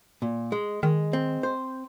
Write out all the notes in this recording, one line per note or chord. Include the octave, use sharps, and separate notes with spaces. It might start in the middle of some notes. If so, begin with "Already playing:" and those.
A#2
G#3
D#3 G#3
C4
C5